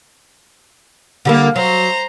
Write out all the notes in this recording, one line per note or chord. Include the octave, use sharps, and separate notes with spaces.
D3 G3 A#3
F#3 C5 A#5